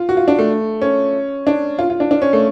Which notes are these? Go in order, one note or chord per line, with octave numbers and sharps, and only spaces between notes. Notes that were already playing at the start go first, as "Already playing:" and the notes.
Already playing: F4
F#4
F4
D4
A3
C#4
D4
F4
F4
D4
D4
C#4
A3